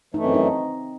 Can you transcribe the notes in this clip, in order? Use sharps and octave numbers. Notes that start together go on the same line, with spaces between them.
F#2 E3 A3 D#4
C4
D#4